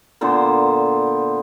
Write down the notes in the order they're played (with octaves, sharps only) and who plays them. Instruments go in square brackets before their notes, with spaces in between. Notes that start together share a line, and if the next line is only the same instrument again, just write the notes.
[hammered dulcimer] A#2 D3 B3 C5